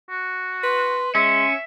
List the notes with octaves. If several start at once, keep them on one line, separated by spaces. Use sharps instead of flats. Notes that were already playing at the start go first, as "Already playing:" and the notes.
F#4
B4 C6
G#3 C#4 E5 C6